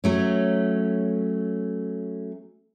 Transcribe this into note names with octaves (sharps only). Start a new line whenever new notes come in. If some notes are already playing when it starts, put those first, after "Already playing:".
F#3 A3 C#4